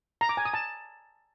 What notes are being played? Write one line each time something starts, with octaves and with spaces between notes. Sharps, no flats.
A#5
D6
G#5
D#6
A5